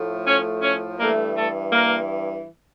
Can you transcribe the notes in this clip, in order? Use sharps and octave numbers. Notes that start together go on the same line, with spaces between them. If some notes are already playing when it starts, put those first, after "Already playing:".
Already playing: A2 F3 A3
C#4 C#5
C#4 C#5
G2 E3 A3 A#3 A#4
A3 A4
A#3 A#4